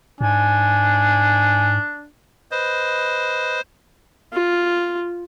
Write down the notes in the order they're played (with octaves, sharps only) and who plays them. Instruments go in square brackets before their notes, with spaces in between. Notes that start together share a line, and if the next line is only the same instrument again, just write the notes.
[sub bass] G#2 [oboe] D4 [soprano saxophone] G#5
[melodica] B4 D#5 [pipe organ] C5
[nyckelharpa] F4